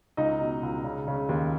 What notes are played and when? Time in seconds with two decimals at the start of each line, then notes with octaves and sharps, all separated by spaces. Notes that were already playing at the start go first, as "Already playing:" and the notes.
0.17 C#2 D#4 D#5
0.40 B2
0.63 C#2
0.84 C#3
1.08 C#3
1.29 D#2